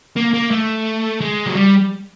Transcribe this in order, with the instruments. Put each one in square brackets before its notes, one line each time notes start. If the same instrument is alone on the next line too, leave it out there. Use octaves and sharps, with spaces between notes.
[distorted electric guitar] A#3
A#3
A3
G#3
F#3
G3